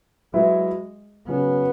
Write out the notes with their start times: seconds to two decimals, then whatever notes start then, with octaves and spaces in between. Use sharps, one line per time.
0.34 F#3 G#3 E4 B4 E5
1.28 C#3 F#3 B3 C#4 F#4